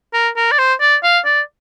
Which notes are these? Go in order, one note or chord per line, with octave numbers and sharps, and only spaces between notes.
A#4
A#4
D5
C5
D5
F5
D5